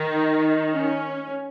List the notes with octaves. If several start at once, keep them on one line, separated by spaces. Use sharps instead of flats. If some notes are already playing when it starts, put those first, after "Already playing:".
Already playing: D#3 D#4
C#4